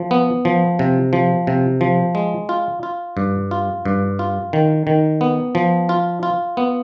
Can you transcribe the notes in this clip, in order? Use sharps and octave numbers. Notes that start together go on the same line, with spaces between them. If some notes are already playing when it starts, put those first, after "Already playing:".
Already playing: F3
B3
F3
C3
F3
C3
F3
G#3
F4
F4
G2
F4
G2
F4
D#3
D#3
B3
F3
F4
F4
B3